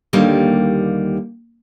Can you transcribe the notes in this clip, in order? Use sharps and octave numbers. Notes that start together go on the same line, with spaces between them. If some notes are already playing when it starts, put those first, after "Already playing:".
D#2 D3 G3 A#3